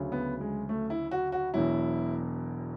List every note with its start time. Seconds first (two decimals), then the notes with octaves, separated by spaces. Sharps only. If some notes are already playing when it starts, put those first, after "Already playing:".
Already playing: D2 C#3 F#3
0.12 B3
0.41 G#3
0.69 A3
0.90 E4
1.11 F#4
1.32 F#4
1.54 E1 E2 B2 F#3 E4